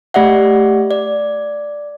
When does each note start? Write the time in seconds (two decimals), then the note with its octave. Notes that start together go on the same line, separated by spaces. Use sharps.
0.14 A3 G4 D5 E5 F#5
0.91 D5